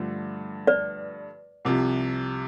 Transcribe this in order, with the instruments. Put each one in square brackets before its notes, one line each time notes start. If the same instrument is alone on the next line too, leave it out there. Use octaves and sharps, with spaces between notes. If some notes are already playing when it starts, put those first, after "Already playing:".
Already playing: [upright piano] G2 D3 F3 A3
[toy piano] B4 D5
[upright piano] C2 C3 F3